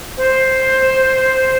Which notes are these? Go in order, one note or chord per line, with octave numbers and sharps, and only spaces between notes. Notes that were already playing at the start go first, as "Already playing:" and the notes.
C5